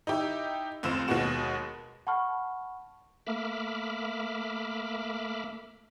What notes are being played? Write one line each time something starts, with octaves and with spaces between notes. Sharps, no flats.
D#4 E4 G4
F1 C#2 C4 E7
D#2 B2 G#3 B3 F#4 E7
F#5 A5 B5 C#6 F6
A3 A#3 E5 B5 D6 F6